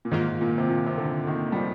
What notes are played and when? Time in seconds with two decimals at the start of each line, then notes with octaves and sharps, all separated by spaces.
0.05 A#2
0.11 G#2 D#3 A#3 F4
0.41 A#2
0.58 C3
0.69 A#2
0.86 C3
0.98 D3
1.27 D#3
1.52 G3
1.56 F3